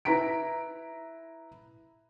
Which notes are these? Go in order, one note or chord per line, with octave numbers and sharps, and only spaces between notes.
E4 B4 A#5 B6 D7